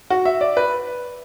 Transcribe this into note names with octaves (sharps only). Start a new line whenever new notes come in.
F#4
E5
D5
B4